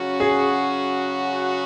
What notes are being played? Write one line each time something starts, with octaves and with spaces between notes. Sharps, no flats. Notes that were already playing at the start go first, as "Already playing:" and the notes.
Already playing: C#3 F#3 C#4 F#4
G#4